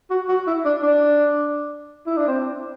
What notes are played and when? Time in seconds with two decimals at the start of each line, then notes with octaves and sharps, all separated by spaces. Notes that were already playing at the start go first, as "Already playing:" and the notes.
0.10 F#4
0.29 F#4
0.47 E4
0.65 D4
0.83 D4
2.06 E4
2.17 D4
2.28 C4